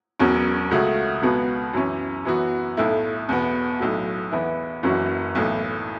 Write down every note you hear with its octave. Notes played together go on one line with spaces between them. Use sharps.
E1 E2 B2 F#3 C#4
C#2 C#3 A3 F#4
C#2 B2 B3 F#4
F#2 E3 C#4
F#2 E3 B3 F#4
B1 A2 A3 E4
E2 B2 B3
B1 A2 F#3
E2 E3 B3 E4
F#1 F#2 E3 C#4 F#4
B1 A2 E3